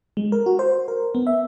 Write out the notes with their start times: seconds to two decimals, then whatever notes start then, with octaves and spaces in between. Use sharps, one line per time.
0.17 G#3
0.32 A#4
0.46 F#4
0.59 C5
0.88 A#4
1.15 B3
1.27 E5